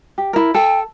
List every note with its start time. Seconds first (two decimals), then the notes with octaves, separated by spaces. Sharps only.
0.18 G4
0.33 E4 A#4
0.55 A4 G5